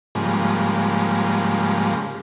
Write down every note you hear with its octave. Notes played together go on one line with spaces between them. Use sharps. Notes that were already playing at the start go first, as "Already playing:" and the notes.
G#2 C#3 F3 G3 G#3 A#3